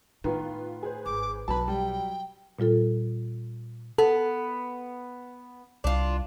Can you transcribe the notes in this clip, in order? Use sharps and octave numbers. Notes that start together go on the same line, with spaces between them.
A2 D#3 B3 F4 B4
G#4 B4 C5
G#1 D6
B1 F#3 B4 A5 B5
G3 G5
A#2 G3 F4 A4
B3 A4
C2 D4 F4